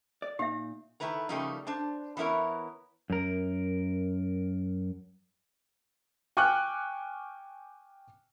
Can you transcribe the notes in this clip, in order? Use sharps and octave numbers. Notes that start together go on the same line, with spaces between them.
D5
A#2 D#4 G4 E5 F5
D#3 A3 E4 B4 A#5
C#3 F3 G3 A3 A#3 D#4
D4 C5 A5
E3 B3 E4 A#4 C#5
F#2 A#4
G5 G#5 C#6 D6 F6 F#6